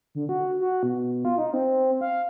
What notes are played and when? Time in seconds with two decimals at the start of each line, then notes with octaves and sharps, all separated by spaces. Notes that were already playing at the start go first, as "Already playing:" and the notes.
0.15 D3
0.29 F#4
0.60 F#4
0.83 B2
1.25 F4
1.38 D#4
1.53 C4
2.01 F5